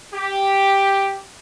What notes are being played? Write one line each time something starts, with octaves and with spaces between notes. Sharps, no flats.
G4